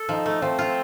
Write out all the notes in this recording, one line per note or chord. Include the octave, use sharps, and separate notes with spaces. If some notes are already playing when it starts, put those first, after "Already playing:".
Already playing: A4
F3 D#4
A3
F3 C4
F4